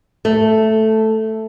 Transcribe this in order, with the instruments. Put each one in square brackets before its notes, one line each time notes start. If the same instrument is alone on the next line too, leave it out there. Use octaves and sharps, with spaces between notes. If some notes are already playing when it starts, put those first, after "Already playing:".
[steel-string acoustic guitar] A3